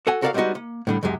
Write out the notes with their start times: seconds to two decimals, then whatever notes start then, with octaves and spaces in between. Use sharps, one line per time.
0.07 F#4 A4 F#5 G#5
0.22 F#4 A4 A#4 D5 E5 F5
0.34 G3 G#3 B3 C4 D#4 F#4
0.55 A#3
0.87 A2 D3 G3
1.03 C#2 F#2 F#3 G#3 G4